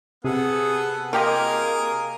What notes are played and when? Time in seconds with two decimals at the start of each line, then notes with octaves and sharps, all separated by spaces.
0.24 C3 B3 G#4 A4 F#5
1.13 A#3 F4 G4 G#4 A#4 D#5